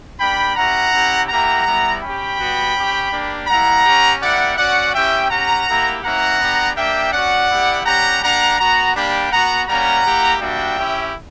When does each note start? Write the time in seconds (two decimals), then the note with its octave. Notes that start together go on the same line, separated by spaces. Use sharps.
0.19 A#3 D4 G4 G5 B5
0.56 C#4 E4 G4 F#5 A#5
0.92 C#4 E4 G4
1.29 A#3 E4 G4 F#5 A#5
1.66 G3 B3 E4
2.02 C#4 G4 G5 B5
2.39 G3 B3 F#4
2.75 C#4 G4
3.12 A#3 D4 G4
3.48 G3 A#3 E4 F#5 A#5
3.85 C#4 G4
4.21 A#3 E4 G4 D5 F#5
4.57 C#4 F#4 D5 F#5
4.94 C#4 E4 G4 E5 G5
5.30 C#4 G4 F#5 A#5
5.68 A#3 E4 G4
6.04 A#3 C#4 E4 F#5 A#5
6.40 B3 D4 G4
6.76 A#3 D4 G4 E5 G5
7.13 C#4 F#4 D5 F#5
7.50 B3 E4 G4
7.85 G3 C#4 G4 F#5 A#5
8.23 A#3 D4 G4 F#5 A#5
8.59 B3 F#4 F#5 A#5
8.95 G3 A#3 D4 G4 G5 B5
9.31 B3 F#4 F#5 A#5
9.68 G3 A#3 C#4 F#5 A#5
10.04 A#3 E4 G4
10.41 G3 A#3 D4 F#4 E5 G5
10.78 C#4 E4 G4